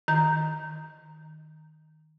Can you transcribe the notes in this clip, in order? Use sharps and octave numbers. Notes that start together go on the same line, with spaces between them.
D#3 A#5 G6